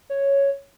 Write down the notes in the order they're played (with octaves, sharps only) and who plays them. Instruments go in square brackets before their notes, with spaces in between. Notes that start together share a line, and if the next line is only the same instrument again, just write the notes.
[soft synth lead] C#5